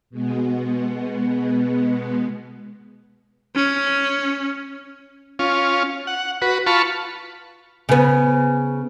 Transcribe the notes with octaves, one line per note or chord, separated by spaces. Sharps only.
B2 G#3 B3
C#4
C#4 F4
F#5
F#4 B4
F4 A5 B5 C#6
C#3 B3